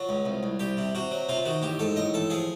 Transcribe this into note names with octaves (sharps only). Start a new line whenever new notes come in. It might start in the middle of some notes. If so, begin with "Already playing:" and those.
Already playing: F#3 F4
C#2
C2
C2
C2 G4
C3
C3 F#4
F#3
C3 F4
D#3 F#4
A1 G4
G#2 A4
A1 D#5
A1 A4
F3 G#4